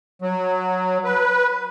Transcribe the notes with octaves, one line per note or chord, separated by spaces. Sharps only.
F#3
B4